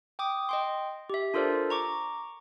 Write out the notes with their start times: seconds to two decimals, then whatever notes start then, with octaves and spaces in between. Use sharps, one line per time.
0.19 G5 D6 D#6
0.49 D#5 G5 C6
1.10 G4 E5
1.34 D4 F4 A4 A#4 C5 D5
1.70 A#5 C#6 D6